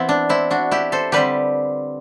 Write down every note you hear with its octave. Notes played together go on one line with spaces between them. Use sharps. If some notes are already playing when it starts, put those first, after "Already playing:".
Already playing: E3 B3 C4 E4
D4
C4 E4
D4 F#4
E4 G4
A4 C5
D3 G3 C4 G4 B4